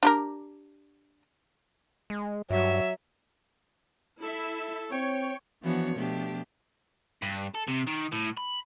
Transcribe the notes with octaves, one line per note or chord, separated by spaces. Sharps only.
D4 G4 A#4
G#3
G2 F#3 E5
E4 A4 E5
C4 C#5 G5
E3 F3 B3 D4 F#4 C#5
B2 F3 A3 D4 G4
G2
A4
C3
D#3
A2
B5